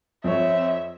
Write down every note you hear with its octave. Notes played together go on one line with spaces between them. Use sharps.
F2 C4 C#5 E5